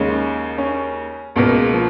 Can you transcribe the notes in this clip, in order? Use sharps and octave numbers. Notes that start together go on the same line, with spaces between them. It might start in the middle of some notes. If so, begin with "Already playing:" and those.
Already playing: D#2 C#3 G#3 C#4
C#4
C#2 B2 A#3 B3
G#3
F3